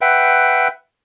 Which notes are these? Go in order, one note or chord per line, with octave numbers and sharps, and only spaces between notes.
B4 E5 F#5 G5